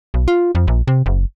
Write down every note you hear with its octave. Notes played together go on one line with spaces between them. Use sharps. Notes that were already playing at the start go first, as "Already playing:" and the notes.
B1
F4
F2
A#1
C3
F#1